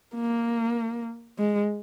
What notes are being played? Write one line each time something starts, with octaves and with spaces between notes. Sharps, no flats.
A#3
G#3